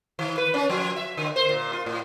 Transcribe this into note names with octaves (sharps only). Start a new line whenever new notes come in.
D#3
B4
C#4
F3
E5
D3
C5
A#2
F4
A2